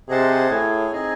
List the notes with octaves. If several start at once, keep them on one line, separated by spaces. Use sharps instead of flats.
C3 G#4 C5 D#5 F#5 A5
A2 G#4 C#5 G#5
C4 D#4 G#4 D#5 G#5